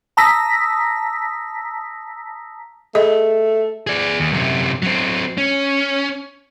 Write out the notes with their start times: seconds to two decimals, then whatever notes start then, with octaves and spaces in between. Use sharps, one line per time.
0.17 A5 A#5 D#6 E6 A#6 B6
2.95 A3 G#4 D#5
3.87 G#4 D5
4.20 D#2
4.33 F#2 C3
4.83 F#3 C4
5.38 C#4